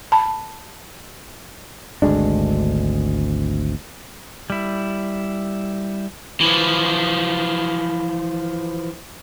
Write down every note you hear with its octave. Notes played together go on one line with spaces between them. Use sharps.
A5 B5
G#1 D2 G#3 D4
G3 E4
E3 F3